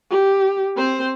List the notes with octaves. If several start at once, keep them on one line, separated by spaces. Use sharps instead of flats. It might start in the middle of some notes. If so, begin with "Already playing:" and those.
G4
C4 C5